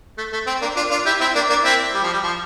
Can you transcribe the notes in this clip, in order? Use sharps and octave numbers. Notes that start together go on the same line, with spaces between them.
A3
A3
C4
A#3 D4
D4 F4
D4 F4
E4 G4
C4 E4
A#3 D4
A#3 D4
C4 E4
G3
F3
G3
F3